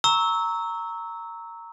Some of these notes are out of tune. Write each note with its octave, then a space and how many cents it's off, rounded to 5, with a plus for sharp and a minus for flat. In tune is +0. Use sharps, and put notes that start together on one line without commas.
A#5 -10 C#6 +0 E6 -20